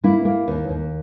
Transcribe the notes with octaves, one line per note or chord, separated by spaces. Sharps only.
A#3 E4
A#3
D#2
D#2